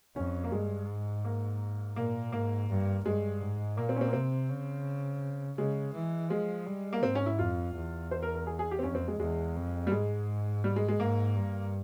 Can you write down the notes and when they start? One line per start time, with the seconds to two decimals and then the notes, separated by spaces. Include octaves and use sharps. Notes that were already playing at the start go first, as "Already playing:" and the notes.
0.16 F2 C#4
0.44 A#3
0.52 G2 G#3
0.88 G#2
1.25 A#3
1.96 A#2 A#3
2.32 G#2 A#3
2.69 G2
3.05 G2 G#3
3.41 G#2
3.77 A#2 A#3
3.89 C4
3.96 C#4
4.01 C4
4.08 A#3
4.13 C3 C4
4.50 C#3
5.58 C#3 G#3
5.94 E3
6.30 F3 G#3
6.66 G3
6.93 A#3
7.03 G#2 C4
7.15 C#4
7.26 E4
7.39 F2 F4
7.75 E2
8.11 C5
8.23 A#4
8.35 A#4
8.47 G#4
8.59 G#4
8.71 G4
8.79 C4
8.83 F2 C#4
8.95 C4
9.08 G#3
9.19 E2 G#3
9.56 F2
9.87 G3
9.92 G#2 G#3
10.64 G3
10.76 G#3
10.88 G#3
11.00 G#2 A#3
11.36 G2